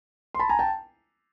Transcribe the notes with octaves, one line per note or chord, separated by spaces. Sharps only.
C6
A5 B5
G#5 A#5
G5 A5